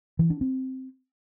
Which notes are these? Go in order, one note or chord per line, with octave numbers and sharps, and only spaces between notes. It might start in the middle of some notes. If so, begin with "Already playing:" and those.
E3
D4
C4